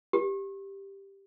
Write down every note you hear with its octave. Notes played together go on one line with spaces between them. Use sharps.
G4